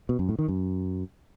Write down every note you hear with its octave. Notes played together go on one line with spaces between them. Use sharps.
B2
F#2
A2
D#3
F#2